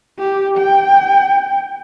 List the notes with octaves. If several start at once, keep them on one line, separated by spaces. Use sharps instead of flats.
G4
G5